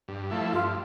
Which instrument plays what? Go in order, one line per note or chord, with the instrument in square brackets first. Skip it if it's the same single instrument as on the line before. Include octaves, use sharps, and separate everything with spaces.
[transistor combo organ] G2
F3 A3 E4
[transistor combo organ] G2 [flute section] F4